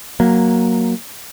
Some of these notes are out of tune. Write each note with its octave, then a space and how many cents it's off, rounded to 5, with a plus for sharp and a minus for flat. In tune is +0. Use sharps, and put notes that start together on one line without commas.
F#3 +0 A#3 +0